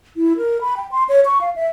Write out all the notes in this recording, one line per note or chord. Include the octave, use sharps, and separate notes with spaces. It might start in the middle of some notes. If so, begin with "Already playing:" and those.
E4
A#4
B5
G5
C6
C#5
C#6
F5
E5